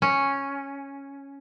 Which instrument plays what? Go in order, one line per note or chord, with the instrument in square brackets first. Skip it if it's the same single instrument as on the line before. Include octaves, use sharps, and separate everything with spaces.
[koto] C#4